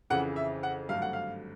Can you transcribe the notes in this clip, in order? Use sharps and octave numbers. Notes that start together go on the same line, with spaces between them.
F2 C#3 E3 F#5
E5
F#5
G#1 G2 D3 F#3 A3 F5
F#5
F5